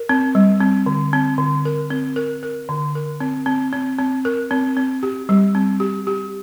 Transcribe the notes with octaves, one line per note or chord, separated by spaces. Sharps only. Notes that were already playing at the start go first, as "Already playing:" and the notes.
Already playing: A#4
C4
G3
C4
D3
C4
D3
A#4
C4
A#4
A#4
D3
A#4
C4
C4
C4
C4
A#4
C4
C4
G4
G3
C4
G4
G4